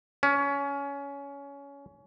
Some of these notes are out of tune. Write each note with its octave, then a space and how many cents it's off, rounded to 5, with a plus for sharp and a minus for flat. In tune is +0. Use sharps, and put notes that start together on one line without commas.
C#4 +20